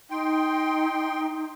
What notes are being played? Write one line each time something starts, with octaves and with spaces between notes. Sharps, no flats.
D#4 G5 C6